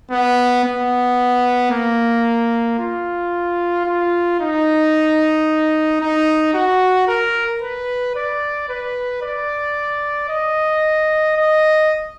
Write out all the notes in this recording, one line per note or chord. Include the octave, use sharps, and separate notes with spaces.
B3
B3
A#3
F4
F4
D#4
D#4
F#4
A#4
B4
D5
B4
D5
D#5
D#5